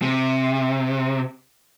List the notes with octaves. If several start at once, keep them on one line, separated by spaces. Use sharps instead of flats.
C3